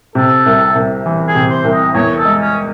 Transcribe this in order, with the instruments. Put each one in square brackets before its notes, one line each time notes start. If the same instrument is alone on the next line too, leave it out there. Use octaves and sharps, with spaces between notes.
[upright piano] C3 [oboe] A4
[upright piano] C2
C2
E3
[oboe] G#4
[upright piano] C3
[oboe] C5
[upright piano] C2
[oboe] D#5
[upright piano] E2 [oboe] C#5
[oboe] A4
[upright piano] G#3
[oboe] C#4